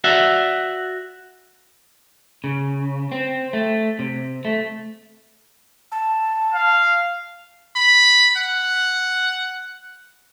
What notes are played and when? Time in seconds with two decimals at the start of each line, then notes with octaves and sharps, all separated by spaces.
0.04 F#4 D5 E5
2.44 C#3
3.12 C4
3.53 A3
3.99 C3
4.45 A3
5.92 A5
6.54 F5
7.76 B5
8.36 F#5